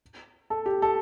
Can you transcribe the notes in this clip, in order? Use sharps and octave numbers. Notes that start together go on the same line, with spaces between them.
A4
G4
A4